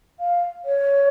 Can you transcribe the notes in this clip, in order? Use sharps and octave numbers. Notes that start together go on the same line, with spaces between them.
F5
C#5